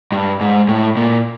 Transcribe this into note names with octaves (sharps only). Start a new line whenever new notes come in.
G2
G#2
A2
A#2